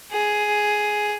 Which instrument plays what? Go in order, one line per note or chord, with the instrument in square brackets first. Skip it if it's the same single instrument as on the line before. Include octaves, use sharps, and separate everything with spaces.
[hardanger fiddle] G#4